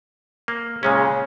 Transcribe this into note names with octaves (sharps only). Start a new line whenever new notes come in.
A#3
A#2 C#3 G#3 C#4